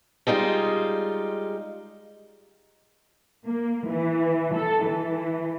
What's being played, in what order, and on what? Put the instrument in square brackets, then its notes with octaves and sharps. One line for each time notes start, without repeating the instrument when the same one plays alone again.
[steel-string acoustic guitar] G3 G#3 D#4 F4
[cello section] A#3
E3
A4
E3